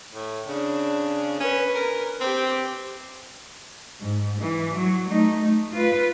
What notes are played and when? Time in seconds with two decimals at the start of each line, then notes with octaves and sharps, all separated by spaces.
0.13 A2
0.47 C#3 D4
1.40 C#4 B4
1.75 A#4
2.21 C4 G4 D6
4.01 G#2
4.42 E3
4.75 F#3
5.10 A3 D#4
5.42 A3
5.72 F4 B4